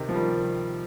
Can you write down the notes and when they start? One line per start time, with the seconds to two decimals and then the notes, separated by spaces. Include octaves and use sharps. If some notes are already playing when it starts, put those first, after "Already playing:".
Already playing: C3 D#3
0.09 F3
0.14 D#3 G3